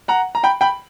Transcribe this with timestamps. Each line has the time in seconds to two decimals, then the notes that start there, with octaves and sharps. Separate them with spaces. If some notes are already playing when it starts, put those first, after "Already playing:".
0.08 F#5 A#5
0.35 A#5
0.43 G5 B5
0.61 G5 B5